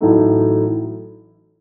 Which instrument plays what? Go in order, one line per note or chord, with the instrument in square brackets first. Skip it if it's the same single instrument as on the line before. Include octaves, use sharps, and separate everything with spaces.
[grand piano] A1 A2 F#3 A3 D#4